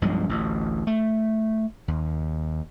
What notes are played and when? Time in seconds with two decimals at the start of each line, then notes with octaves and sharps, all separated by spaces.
0.02 B1 G2 F3 G#3
0.29 A1 D2
0.87 A3
1.88 D#2